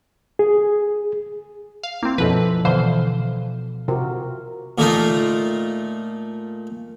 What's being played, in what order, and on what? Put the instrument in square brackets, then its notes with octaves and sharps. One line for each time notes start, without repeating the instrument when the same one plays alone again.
[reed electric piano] G#4
[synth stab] F5
[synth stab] A#3 C4 [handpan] E4
[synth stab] F#2 B2 B4 [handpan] F3 A4
[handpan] B2 F5 [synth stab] D3 E3 C5
[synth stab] C3 [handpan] F4 F#4 A#4
[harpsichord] A#2 A3 D#4 F4